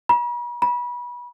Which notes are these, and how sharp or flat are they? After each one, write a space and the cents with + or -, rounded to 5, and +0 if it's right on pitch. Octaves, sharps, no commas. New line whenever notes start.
B5 -45
B5 -30